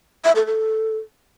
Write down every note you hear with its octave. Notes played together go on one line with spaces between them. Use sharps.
E5
A4
A4